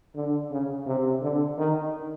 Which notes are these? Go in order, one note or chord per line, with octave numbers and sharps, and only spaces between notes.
D3
C#3
C3
D3
D#3